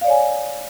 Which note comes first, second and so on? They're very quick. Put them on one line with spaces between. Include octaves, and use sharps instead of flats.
F5 D5 C#5 G#5